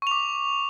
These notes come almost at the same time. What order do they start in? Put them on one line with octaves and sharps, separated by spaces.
C#6 F7 D6